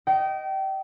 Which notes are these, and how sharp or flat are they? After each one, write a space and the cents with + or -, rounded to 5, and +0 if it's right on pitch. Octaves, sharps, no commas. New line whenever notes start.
D#5 +0 G5 -30